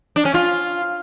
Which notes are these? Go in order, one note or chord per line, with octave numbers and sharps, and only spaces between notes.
D4
C#4
F4